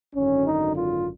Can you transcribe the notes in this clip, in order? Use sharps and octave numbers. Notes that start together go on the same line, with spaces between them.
G#1 F#2 D3 C#4
D#4
F4